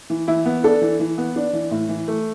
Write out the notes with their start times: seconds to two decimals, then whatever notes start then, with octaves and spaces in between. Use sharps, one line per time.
0.10 E3
0.28 E3 E4
0.45 B3
0.64 D4 A4
0.82 E3
1.00 E3
1.18 B3
1.36 D4
1.53 E3
1.71 A2
1.89 E3
2.08 A3